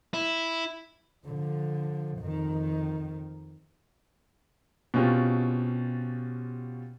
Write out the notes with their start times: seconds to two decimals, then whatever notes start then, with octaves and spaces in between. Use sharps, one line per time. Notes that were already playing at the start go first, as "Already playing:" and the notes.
0.14 E4
1.25 D3 F3
2.18 F2 D#3
4.94 B2 C4 C#4 F4 G4